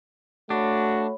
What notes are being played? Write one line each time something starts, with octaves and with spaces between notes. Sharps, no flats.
A3 D4 F#4 C#5 B5